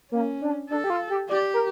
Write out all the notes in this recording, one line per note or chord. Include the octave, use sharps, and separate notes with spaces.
A#3 C#4
D4
D4 A4
G4
F4
G4
G4 D5
A#4